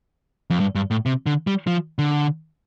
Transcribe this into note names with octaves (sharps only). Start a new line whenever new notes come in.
F2
G2
G2
A2
C3
D3
G3
F3
D3